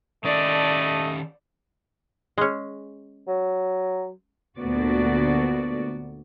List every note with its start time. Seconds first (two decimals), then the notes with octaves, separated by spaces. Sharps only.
0.24 D#3 A3 C#4 D5 D#5 A5
2.38 G#3 C#4
3.28 F#3
4.59 D2 A#2 B3 F#4 D5